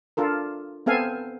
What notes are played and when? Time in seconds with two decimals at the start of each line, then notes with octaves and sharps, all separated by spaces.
0.17 D4 F4 A4 A#4
0.86 B3 C4 A4 F5 G#5